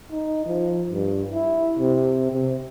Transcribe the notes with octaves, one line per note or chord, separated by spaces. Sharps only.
D#4
F3
G2
E4
C3
C3